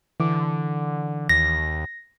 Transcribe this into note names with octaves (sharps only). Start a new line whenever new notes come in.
D3 E3 D6
D#2 A#6